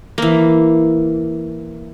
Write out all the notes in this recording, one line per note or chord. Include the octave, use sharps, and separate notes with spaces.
E3 A#3